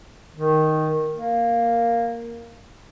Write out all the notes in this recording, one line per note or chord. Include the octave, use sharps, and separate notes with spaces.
D#3
A#3